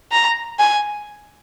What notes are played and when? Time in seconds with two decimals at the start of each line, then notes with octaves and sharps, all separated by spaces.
0.12 A#5
0.59 G#5